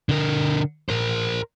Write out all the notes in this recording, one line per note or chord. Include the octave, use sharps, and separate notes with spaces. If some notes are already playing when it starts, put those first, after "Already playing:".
D3 A#4
A#4 C5